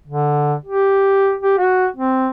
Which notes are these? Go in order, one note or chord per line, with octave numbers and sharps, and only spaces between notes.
D3
G4
G4
F#4
C4